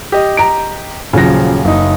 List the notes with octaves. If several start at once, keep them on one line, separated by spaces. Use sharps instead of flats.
G4 D#5
A#5 D7
D#1 C#3 F3 F#3 A#6
F#1 D#4